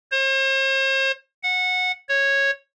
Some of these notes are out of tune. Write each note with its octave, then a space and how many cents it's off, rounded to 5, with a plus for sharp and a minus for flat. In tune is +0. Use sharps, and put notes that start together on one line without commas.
C5 +45
F#5 -15
C#5 -10